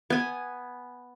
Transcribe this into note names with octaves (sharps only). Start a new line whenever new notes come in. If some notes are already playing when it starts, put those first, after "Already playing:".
B3 G#5